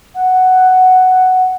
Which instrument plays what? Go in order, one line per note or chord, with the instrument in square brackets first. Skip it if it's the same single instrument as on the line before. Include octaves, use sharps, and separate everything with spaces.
[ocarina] F#5